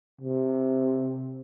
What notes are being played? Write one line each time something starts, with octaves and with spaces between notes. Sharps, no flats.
C3